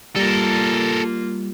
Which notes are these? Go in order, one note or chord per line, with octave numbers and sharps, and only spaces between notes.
G3 A#3 F4 A4 A#4